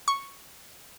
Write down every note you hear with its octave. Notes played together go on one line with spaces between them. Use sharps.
C#6